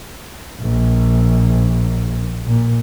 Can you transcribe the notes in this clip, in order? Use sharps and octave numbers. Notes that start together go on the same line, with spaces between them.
A#1
A#2